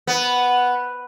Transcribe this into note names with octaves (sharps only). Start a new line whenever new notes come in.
B3